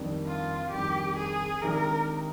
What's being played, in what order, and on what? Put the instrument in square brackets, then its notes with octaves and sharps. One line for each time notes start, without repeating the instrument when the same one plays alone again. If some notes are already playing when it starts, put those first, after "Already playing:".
Already playing: [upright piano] F2 D#3 G3 D4
[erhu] F4
[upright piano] F2 D#3 G3 D4 [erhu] G4
[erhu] G#4
[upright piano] C3 D#3 G#3 D4 G4 [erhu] A#4